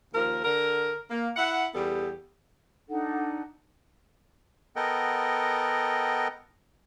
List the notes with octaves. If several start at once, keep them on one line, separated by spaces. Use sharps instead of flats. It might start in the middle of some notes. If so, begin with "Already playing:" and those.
D#2 F3 A#4
D3 A#4
A#3
E4 F#5
E2 G3 B3 G4 A4
D4 D#4 A4 F#5
B3 A4 A#4 D#5 F#5 G5